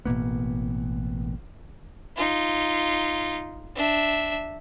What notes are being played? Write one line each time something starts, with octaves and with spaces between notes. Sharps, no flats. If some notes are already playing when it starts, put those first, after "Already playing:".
A1 B2 A#3 B3
D#4 F4
D4 E5